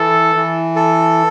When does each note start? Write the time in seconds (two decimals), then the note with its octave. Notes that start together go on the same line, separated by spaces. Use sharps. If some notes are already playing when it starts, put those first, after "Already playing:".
Already playing: E3 A4
0.35 E3
0.76 A4